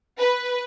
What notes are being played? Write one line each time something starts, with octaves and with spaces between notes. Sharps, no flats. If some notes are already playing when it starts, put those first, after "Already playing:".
B4